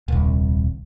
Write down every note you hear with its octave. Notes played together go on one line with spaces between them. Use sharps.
D#1 C2